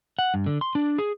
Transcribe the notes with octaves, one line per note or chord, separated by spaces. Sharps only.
F#5
G2
D3
C6
D4
G#4